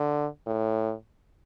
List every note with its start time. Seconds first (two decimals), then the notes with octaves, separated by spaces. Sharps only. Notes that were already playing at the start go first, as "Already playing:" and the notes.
Already playing: D3
0.47 A2